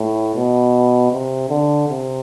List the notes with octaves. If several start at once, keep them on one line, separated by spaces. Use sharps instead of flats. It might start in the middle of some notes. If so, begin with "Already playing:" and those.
Already playing: A2
B2
C3
D3
C3